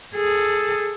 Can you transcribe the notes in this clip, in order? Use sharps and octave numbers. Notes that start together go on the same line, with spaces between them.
G#4 A4